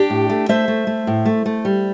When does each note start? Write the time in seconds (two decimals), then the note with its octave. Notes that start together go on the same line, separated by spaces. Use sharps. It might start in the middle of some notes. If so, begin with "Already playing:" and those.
Already playing: D4 G4
0.10 A2
0.30 A3
0.49 A3 C5 E5
0.68 A3
0.87 A3
1.07 A2
1.25 A3
1.46 A3
1.65 G3